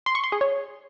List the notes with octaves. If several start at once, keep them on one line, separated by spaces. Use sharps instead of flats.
C6
C#6
C6
G#4
C#5